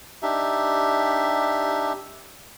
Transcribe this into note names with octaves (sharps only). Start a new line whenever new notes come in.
D4 D#4 G4 E5